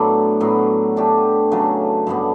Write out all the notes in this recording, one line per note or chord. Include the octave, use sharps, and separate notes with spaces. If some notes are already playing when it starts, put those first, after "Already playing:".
Already playing: A2 F#3 B3 D4
A2 F#3 B3
A3 D4 G4
C#3 F#3 A3
G2 D3 G3 B3